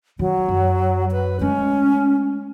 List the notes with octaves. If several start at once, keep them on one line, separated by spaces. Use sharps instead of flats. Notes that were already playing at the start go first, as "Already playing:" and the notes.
D#3 F#3
F#2
B4
G#3 A3 C#4